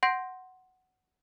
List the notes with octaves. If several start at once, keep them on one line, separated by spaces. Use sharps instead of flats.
F#5 C6 G6 A#6 D7